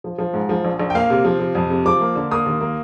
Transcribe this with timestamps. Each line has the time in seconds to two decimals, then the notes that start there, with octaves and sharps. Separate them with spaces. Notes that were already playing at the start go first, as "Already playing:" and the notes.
0.04 F3
0.18 F3
0.34 G#2
0.49 F3
0.65 A#1
0.80 A#1
0.90 G5
0.95 A#3 F5
1.10 C3
1.25 F3
1.39 C3
1.55 F2
1.70 C3
1.85 F3 D6
2.01 A#3
2.15 D3
2.31 A#3 D#6
2.46 D#2
2.61 A#3